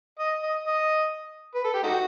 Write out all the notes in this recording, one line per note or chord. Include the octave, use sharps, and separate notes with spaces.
D#5
D#5
D#5
B4
A4
G4
A3 D#4 F#4